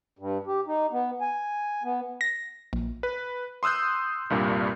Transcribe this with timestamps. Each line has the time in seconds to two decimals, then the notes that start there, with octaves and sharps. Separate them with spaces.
0.19 G2
0.47 G4
0.67 D#4
0.92 B3
1.21 G#5
1.83 B3
2.21 A#6
2.73 A#1
3.03 B4
3.63 C6 D#6 E6 F#6 G6
4.30 C2 G2 A#2 G3